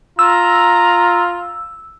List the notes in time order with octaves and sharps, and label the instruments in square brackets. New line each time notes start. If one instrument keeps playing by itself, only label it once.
[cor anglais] F4 [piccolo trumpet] A#5 [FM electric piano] E6